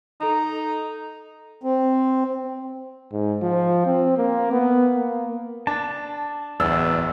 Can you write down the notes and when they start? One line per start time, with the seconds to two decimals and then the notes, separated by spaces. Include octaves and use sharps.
0.21 D#4 A4 A#5
1.64 C4
3.12 G#2
3.42 F3
3.86 C4
4.17 A#3
4.52 B3
4.95 A#3
5.67 D4 A5
6.60 D1 E2 D5 E6